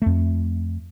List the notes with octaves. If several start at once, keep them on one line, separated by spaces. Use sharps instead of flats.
F2 A3